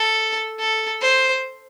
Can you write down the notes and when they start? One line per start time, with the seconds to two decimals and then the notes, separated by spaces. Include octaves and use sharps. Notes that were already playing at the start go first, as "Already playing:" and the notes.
Already playing: A4
0.59 A4
1.01 C5